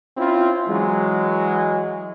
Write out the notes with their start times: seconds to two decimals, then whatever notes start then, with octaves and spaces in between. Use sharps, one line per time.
0.17 C4 C#4 E4 F4
0.69 E3 F#3 G#3